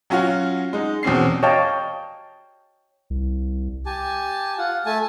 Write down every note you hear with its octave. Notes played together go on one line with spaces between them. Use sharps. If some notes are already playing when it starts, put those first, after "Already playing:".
F#3 C#4 F4 F#4
G#3 D#4
E2 B2 C4 C#4 C7
C#5 D#5 F5 G5 A5
C2
G4 G#5 A5
F4 F#5
A3 G#5 A5